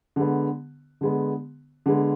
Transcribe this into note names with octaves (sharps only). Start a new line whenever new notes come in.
D3 G#3 B3
D3 G#3 B3
D3 G#3 B3